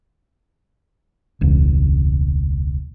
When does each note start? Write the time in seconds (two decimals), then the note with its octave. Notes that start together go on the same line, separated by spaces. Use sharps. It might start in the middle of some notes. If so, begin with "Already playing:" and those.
1.41 E1 C#2